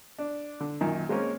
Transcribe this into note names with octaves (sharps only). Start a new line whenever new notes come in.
D4
D3
F#2 A#2 D#3
G#3 A#3 C4 C#4 A#4